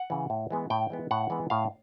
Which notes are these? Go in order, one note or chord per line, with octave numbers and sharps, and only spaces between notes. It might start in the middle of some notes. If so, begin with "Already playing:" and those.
Already playing: F#5
C#3 E3
A2
E3 G#3 B3
A2 G5
E3 G#3 B3
A2 F#5
E3 G#3 B3
A2 F5